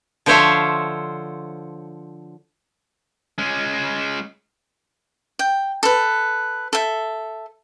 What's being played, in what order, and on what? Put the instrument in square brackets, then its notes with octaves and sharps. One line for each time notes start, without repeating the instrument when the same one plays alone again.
[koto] D3 F3 C5 C#5 E5 F5
[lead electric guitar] G#3 C#4
[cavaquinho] G5
A4 B4
A4 E5